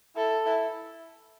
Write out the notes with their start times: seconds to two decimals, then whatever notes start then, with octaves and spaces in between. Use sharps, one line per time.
0.16 E4 A4
0.46 E4